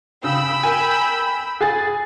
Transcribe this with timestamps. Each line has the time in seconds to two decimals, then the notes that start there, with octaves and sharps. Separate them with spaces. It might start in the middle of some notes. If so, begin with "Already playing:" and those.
0.24 C#3 G5 B5 E6
0.63 A#4 G#5
1.61 G#4 G#5 A6